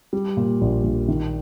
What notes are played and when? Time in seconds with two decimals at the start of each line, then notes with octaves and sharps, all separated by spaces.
0.13 G3
0.37 A#2
0.61 A#1
0.84 A#1
1.08 D#3